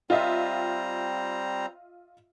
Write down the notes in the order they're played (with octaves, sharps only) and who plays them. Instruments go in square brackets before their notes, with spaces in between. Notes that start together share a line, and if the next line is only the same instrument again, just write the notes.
[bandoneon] G3 C4 A#5 [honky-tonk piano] F4 D#5 E5